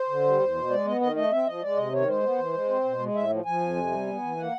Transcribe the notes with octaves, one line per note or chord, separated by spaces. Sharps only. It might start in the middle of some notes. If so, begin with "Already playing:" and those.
Already playing: C5
D3
G3
E2
B2
G#3 D5
B3 D#5
D#3 D#5
A3 D#5
C4 E5
F3 D#5
G#3 D5
C3 D#5
D#3 C#5
G#3 C5
B3
E3
G#3
C4
B2
G#3
A2 E5
F3
F3 G#5
F2
C3
G3
B3
E3
A#3 F#5